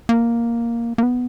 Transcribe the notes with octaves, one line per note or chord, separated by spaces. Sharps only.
A#3
A#3
B3